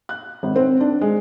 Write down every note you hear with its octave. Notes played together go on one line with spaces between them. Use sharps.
F#6
G#1
C4
D4
G#3